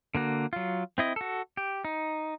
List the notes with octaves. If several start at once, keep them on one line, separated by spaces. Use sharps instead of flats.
D3 A#3 F#4
F#3 F4
C4 E4 D#5
F#4 A4
G4
D#4